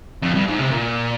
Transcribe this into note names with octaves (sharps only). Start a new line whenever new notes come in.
F2
G2
G#2
C3
A#2